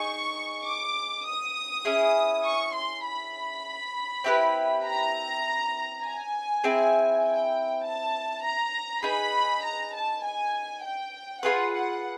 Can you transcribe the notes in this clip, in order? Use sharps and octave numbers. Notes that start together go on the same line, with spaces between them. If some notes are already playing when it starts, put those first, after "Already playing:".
Already playing: D#4 G#4 C#6
D6
D#6
C#4 E4 G#4
C#6
C6
B5
C4 E4 G4 B4
A#5
G#5
C4 E4 G#4
G5
A5
A#5
D#4 G#4 B4 B5
A#5
A5
G#5
G5
F4 G#4 B4 F#5
F#5